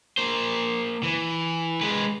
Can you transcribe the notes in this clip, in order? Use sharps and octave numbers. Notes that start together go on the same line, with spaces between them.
A#3 C5
E3
G#3 B4